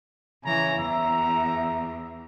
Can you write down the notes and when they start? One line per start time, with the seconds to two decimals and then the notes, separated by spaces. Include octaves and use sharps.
0.43 C#3 E3 C#5 G#5 A#5
0.76 E2 E5 A#5